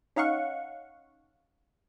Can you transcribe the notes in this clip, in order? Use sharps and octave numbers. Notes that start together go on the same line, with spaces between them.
C#4 D#4 F5 F#5 C#6